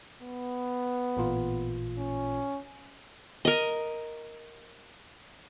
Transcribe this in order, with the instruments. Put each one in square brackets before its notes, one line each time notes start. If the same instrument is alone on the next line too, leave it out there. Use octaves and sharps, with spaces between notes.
[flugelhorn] B3
[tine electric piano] A1 A#2 F4
[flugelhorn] C#4
[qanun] A#4 D#5